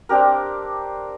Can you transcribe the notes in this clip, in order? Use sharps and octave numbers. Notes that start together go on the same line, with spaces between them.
C4 D4 G4 A#4